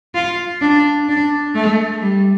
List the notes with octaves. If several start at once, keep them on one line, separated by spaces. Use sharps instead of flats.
F4
D4
D4
A3
G3